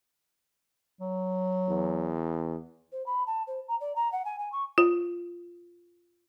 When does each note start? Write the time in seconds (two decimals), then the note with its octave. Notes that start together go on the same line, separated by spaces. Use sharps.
1.01 F#3
1.68 E2
2.92 C5
3.06 B5
3.26 A5
3.47 C5
3.68 A#5
3.80 D5
3.95 A#5
4.12 F#5
4.25 G#5
4.38 G#5
4.52 C#6
4.78 F4